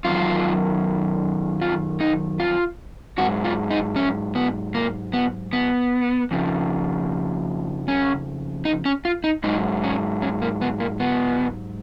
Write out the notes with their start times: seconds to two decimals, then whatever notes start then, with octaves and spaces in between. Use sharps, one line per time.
0.05 F#2 D#3 F#3 F4
1.62 F4
2.00 D#4
2.40 F4
3.18 G#2 F#3 F#4
3.44 F4
3.71 D#4
3.96 C#4
4.35 B3
4.74 A#3
5.13 B3
5.53 B3
6.31 F2 C#3 F3
7.88 C#4
8.65 D#4
8.85 C#4
9.05 F4
9.24 D#4
9.44 G#2 F#3 D#4
9.84 C#4
10.22 C#4
10.42 A#3
10.61 B3
10.80 A#3
11.00 B3